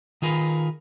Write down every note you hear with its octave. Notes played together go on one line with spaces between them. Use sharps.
D#3 F4 G#4 A#4 B4